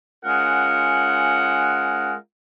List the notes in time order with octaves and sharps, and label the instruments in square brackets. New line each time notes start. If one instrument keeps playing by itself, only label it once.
[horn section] G#3 C#4 F4 A#4 F#5